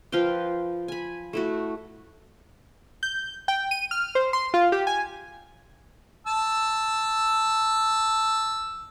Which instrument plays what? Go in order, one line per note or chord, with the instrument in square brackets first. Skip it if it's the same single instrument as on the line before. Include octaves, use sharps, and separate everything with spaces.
[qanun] F3 B4 F5 G5
G#5 B5
A3 E4 F#4
[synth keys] G6
G5
D#7
F6
C5
C6
F4
G4
G#5
[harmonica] A5 E6